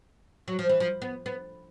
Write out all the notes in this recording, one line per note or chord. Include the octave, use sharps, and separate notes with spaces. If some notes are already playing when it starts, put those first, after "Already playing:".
F#3
F3
E3
F3
B3
B3